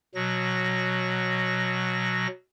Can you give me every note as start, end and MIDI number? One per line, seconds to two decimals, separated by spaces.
0.15 2.27 47
0.15 2.27 54
0.15 2.27 94